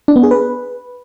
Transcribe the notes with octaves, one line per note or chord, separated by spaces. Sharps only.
D4
B3
G#4
B4